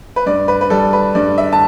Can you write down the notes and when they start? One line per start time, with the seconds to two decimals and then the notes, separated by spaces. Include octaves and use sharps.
0.16 B4
0.26 G2 D5
0.48 B4
0.61 B4
0.70 G3 A4
0.93 B4
1.15 G2 D5
1.38 E5
1.53 A5